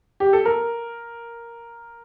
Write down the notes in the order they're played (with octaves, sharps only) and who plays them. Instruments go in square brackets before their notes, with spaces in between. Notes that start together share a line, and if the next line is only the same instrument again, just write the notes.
[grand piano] G4
A4
A#4